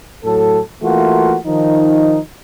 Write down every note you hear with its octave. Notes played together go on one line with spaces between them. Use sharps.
A2 F#3 A4
E3 A3 A#3 F4 F#4
D#3 F3 D#4